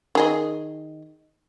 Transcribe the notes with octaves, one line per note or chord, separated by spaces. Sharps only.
D#3 G#4 D#5